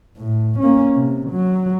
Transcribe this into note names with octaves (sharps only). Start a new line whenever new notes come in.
A2
A#3 C#4
C3
F#3